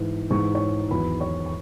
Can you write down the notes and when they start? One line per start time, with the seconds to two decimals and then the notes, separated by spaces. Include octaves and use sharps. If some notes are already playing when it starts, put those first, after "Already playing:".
Already playing: G#2 E3
0.30 G#2 E3 C#6
0.55 C#5 C#6
0.90 E2 D#3 F#3 B4 B5
1.20 C#5 C#6
1.46 C#6